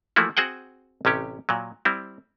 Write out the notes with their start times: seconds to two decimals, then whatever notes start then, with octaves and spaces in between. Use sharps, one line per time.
0.16 E3 F3 A3 A#3 E4 F#4
0.37 C4 F#4 G#4 F#5 G5
1.05 A1 C3 C#4 G4
1.49 A#2 F#3
1.85 G3 C4 E4